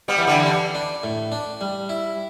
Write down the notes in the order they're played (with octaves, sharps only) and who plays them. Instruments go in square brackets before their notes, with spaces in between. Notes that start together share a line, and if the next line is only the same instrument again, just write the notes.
[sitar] G3 B3
[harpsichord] E3
[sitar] D3 G3
[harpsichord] D4
D4
A2
D4
G3
E4